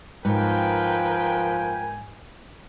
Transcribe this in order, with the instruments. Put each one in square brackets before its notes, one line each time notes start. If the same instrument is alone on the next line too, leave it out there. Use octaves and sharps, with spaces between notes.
[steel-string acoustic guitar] G#2 [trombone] F3 [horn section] A#4 B4 G5 [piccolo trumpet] G#5